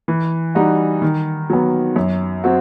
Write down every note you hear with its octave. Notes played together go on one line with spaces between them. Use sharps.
E3
G3 D#4 F#4
D#3
F#3 B3
F#2
F#3 C4 F#4